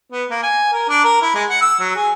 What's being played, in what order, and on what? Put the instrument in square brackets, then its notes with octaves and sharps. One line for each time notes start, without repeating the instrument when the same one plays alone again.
[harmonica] B3
A#3
G#5
A#4
D4
A#4
E4
G#3
F#5
E6
F#3
G#4